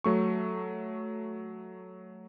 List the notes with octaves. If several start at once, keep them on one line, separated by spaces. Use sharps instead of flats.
F#3 A3 C#6